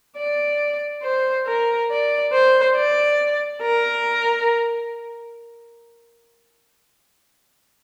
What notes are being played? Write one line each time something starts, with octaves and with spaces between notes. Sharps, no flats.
D5
C5
A#4
D5
C5
D5
A#4